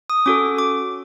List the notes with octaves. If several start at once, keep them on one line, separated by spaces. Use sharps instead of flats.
D#6
C#4 F#4 A4 D6
D6